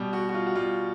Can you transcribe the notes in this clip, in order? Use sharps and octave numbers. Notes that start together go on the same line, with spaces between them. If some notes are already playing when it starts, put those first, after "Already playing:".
Already playing: B2 G3
F#4
F#4
F4
F#4
B2 G3 F4